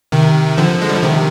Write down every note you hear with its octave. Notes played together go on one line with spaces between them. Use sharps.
C3 D#3
D3 F3
G#3
G3
F3
C3 D#3